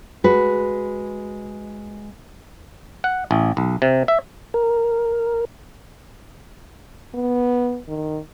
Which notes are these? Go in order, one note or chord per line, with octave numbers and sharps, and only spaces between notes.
G#3 F#4 B4
F#5
A1
B1
C3
E5
A#4
B3
D#3